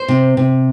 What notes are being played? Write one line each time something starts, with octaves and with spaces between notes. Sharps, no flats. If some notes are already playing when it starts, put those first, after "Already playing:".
Already playing: C5
C3
C3